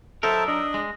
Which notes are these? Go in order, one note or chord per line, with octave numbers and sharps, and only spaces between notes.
F#3 D#4 A4 A#4 C5 E5 A5 E6
D4 D#5
G#3 A#6